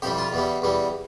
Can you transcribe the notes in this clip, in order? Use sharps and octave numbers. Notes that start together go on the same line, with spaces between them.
F2 E3 G3 G4
F4
E2 E3 G3
E2 E3 G3